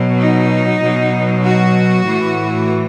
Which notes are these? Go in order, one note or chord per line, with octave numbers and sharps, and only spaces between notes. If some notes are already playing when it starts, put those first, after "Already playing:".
Already playing: B2 F#3
D#4
B2 F#3
F#4
A2 E3